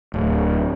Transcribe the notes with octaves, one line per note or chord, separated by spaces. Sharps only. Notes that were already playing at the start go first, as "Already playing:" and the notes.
D1